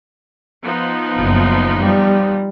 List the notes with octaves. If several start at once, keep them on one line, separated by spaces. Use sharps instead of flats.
F3 B3 D#4
F#1
G3